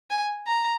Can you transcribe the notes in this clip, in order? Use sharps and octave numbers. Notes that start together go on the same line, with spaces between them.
G#5
A#5